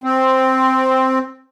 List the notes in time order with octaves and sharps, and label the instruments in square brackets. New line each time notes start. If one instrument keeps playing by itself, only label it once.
[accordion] C4